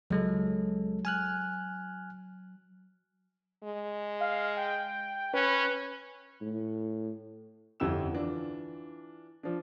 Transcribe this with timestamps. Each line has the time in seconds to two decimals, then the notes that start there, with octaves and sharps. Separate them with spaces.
0.11 C#2 F#3 G#3 A4
1.05 G#5 F6 F#6
3.64 G#3
4.21 F5
4.57 G5
5.34 C#4 B4
6.41 A2
7.80 G1 F2 E4 G4 E6 E7
8.13 E3 D4 F4
9.43 F3 D4